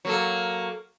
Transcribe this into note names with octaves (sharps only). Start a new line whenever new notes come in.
F#3 A#3 A4